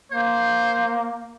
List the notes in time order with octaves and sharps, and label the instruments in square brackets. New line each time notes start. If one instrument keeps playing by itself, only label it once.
[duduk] A#3 [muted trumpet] C5